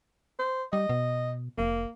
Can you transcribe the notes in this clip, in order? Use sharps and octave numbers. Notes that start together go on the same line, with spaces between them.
C5
G3 D#5
B2
F1 A#3